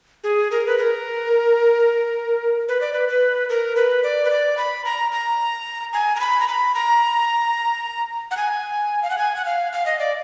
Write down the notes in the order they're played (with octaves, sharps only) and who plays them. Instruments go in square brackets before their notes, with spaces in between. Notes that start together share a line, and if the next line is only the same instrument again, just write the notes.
[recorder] G#4
A#4
B4
A#4
B4
D5
B4
B4
A#4
B4
D5
B4
D5
B5
A#5
A#5
G#5
A#5
B5
A#5
B5
A#5
F#5
G#5
F5
F#5
G#5
F#5
F5
F5
D#5
D5